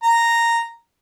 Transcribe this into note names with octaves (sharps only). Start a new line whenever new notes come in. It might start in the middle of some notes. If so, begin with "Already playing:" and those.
A#5